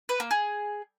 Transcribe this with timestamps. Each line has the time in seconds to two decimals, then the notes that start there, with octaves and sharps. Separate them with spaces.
0.09 B4
0.20 A#3
0.31 G#4